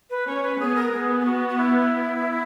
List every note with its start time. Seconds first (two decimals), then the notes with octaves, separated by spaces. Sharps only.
0.10 B4
0.26 C#4 C#5
0.43 B4
0.59 B3 G#4
0.75 A#4
0.92 B3 G#4
1.20 G#4
1.25 F#4
1.48 F#4
1.57 E4